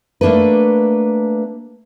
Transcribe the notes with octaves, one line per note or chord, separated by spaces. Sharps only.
A3 A#3 D4 A4 B4